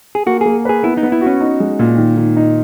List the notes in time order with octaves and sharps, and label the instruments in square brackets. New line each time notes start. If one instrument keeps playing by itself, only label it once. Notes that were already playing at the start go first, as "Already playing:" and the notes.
[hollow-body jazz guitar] G#4
[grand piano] A#3 [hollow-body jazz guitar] F#4
[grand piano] A#3 [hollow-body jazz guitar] G#4
[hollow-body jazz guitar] G#4 [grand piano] B4
[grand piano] B3 [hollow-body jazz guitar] E4
[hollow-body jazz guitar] D#4
[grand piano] B3
[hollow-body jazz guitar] E4
[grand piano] F#4
[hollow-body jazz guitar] C#4
[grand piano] D#4
G#3
A#2
D#3
D#3
D#4